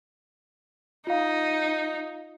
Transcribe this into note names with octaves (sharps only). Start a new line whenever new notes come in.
D#4 F4 F5